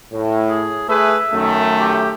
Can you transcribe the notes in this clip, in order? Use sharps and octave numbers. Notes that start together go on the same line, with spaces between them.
A2
G#4
A3 G#4 B4 E5
F#2 D#3 A3
G4